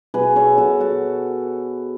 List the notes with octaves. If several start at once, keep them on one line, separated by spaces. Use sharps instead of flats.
B2 G#4 B4
A4 C#5
B2 F#4 A4
F#4 A4